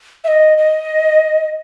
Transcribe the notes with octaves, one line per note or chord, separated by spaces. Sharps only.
E5
D#5
D#5